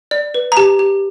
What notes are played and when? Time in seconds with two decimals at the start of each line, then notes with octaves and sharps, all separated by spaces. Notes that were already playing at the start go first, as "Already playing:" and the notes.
0.11 D5
0.34 B4
0.52 A#5
0.57 G4 A5
0.79 G4